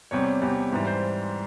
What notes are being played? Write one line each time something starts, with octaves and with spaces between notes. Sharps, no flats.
E2 C3 G3 C#5
E2 C3 G3
G#2 E3 G3
C5